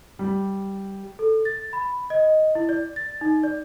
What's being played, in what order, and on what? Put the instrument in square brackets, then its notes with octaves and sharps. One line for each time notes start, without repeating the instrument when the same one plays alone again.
[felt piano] G3
[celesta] A4
A6
B5
D#5
E4
D5
A6
D#4
D5